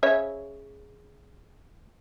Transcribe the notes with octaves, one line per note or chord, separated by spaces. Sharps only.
C#3 C#5 E5